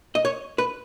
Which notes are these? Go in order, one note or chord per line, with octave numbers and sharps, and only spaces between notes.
D#5
C#5
B4